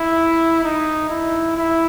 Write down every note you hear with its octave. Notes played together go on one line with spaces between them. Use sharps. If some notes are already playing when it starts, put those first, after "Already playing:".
Already playing: E4
D#4
E4
E4